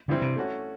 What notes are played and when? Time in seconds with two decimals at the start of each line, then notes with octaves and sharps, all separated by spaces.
0.08 G2 D3 E3 G3 C4 E4
0.22 C3
0.36 A3 C#4 F#4